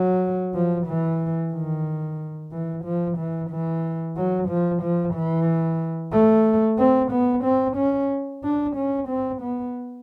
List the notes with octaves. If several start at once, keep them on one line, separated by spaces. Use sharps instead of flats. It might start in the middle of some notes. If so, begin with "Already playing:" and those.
Already playing: F#3
F3
E3
D#3
E3
F3
E3
E3
F#3
F3
F3
E3
A3
C4
B3
C4
C#4
D4
C#4
C4
B3